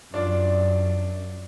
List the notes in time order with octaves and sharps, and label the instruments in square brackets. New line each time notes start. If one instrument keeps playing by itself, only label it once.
[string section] F#2 [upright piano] D4 F4 D5